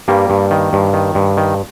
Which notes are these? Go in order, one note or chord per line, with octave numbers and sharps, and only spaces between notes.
G2 G3 A#3
G2
D#3
G2
D#3
G2
D#3